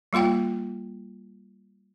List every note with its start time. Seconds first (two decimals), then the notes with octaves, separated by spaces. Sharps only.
0.13 G3 A#3 F4 F#5 G5